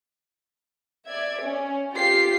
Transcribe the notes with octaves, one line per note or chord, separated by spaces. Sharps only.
D5 E5 G#6
C#4
F4 G4 B6 C7